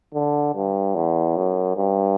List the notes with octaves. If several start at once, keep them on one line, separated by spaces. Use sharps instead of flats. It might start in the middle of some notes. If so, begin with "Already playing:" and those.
D3
G2
E2
F#2
G2